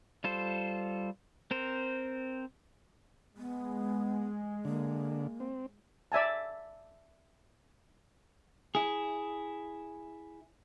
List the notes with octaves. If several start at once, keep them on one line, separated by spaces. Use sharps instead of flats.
G3 F4 A4 C5
C4 A#4 C5
G#3 B3
D3 A#3
C4
D5 E5 G#5 A5
E4 G#4